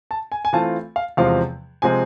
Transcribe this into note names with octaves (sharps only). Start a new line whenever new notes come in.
A5
G#5
G#5
E3 A3 C4 F4 A5
F5
E2 C3 F3 G#3 C4 F5
C3 F3 G#3 C4 G#5